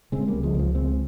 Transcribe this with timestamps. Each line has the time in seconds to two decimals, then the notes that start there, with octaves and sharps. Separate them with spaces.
0.12 C#3 G#3 C4
0.28 G3 A#3
0.34 C#2
0.43 F3 G#3
0.54 C#2 F3
0.75 C#3 G#3 C4